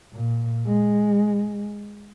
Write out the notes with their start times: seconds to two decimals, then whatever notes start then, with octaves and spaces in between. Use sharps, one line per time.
0.13 A#2
0.67 G#3